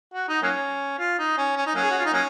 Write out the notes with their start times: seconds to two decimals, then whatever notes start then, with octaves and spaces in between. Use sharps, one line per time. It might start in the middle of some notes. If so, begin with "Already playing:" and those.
0.14 F#4
0.28 D#4
0.42 F#3 A#3 C#4
0.99 F4
1.19 D#4
1.37 C#4
1.56 C#4
1.66 D#4
1.75 F#3 A#3 C#4
1.83 G#4
1.90 F#4
1.98 F4
2.05 D#4
2.13 F#3 A#3 C#4